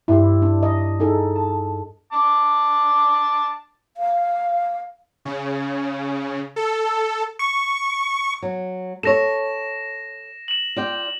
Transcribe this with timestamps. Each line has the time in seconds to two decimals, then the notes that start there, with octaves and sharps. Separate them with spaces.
0.08 G2 E4 G4 C6
0.42 D4
0.63 D#5
1.00 D#4 G#4 A4
1.36 A5
2.13 A5 D6
3.97 F5
5.25 C#3
6.56 A4
7.39 C#6
8.42 F#3
9.03 A4 C#5 A#6 E7
10.48 E7 F#7
10.76 F4 D5 G5